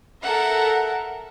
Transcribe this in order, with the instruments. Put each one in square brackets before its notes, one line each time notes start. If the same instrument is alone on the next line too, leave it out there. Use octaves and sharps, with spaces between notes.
[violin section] A4 A#4 E5 F#5